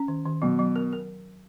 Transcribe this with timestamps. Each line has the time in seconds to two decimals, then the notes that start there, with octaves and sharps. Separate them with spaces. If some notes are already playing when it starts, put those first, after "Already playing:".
Already playing: C#4
0.08 D#3
0.26 D#3
0.42 B2 F#3
0.59 F#3
0.76 A#4
0.93 A#4